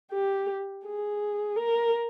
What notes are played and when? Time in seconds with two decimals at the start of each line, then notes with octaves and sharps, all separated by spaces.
0.12 G4
0.86 G#4
1.56 A#4